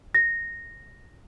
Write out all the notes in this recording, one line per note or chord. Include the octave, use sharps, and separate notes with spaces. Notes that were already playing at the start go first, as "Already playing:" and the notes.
A#6